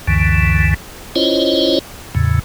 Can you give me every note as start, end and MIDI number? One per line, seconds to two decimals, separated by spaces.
0.07 0.74 37
0.07 0.74 42
0.07 0.74 50
0.07 0.74 52
1.16 1.79 61
1.16 1.79 64
1.16 1.79 65
1.16 1.79 72
1.16 1.79 73
1.16 1.79 75
2.15 2.39 40
2.15 2.39 45
2.15 2.39 49